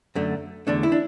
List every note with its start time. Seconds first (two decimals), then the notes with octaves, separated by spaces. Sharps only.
0.15 F#2 D3 A3
0.67 E2 D3 A3 D4
0.83 E4
0.92 D4